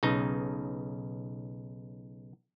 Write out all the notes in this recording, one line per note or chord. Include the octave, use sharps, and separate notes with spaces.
B1 C#3 D#4